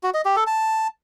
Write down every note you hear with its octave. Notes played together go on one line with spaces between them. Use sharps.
F#4
D#5
G4
A4
A5